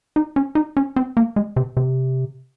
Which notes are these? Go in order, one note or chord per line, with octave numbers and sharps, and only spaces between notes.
D#4
C#4
D#4
C#4
C4
A#3
G#3
C3
C3